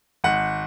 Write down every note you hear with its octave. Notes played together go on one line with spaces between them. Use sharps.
G#1 F#5